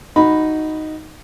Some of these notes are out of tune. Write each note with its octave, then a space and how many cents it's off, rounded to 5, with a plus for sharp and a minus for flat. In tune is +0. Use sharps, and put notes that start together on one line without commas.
D#4 +0 F#4 +0 B5 +0